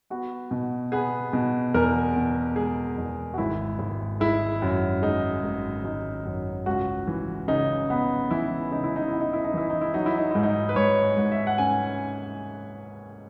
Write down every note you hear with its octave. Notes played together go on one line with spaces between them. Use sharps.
B3 F#4
B2
B3 G#4
B2
E2 A#4
B2
G#3 G#4
E2
F#4
G#1 E4
G#1
G#3 E4
F#2
G#3 D#4
G#1
G#1 D#4
F#2
C#2 F#4
E3
C#3 D#4
B3
E3 E4
C#3 D#4
E4
D#4
B3 E4
D#4
E4
D#4
E3 E4
D#4
E4
F#3 D#4
E4
D#4
G#2 E4
D#4
B4
G#2 C#5
G#2
E5
F#5
C#4 G#5